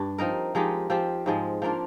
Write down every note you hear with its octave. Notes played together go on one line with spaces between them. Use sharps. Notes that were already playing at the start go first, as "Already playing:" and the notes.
Already playing: G2 D4
F3 C4 D#4 A#4
F3 G#3 D#4 G4
F3 C4 G4
G#2 F3 G#3
F3 A#3 D4 F4